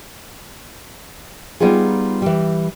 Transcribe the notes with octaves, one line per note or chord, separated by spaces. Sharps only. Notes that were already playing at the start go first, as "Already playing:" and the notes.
G3 B3 D#4 F4 G#4
E3 G3